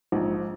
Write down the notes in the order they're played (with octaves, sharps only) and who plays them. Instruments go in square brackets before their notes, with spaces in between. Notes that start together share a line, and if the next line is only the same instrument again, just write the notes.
[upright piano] A#1 G#2 F3 D#4